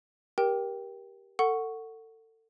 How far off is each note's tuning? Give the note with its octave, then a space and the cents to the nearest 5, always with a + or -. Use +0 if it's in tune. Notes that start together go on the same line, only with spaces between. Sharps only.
G4 +0 A#4 +25 G5 +0
A4 +30 F#5 +0 C#6 +0